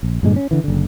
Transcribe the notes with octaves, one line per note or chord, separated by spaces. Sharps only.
A#1
G2 A#2 D3 G#3
C#4
D3 E3
F#1 D3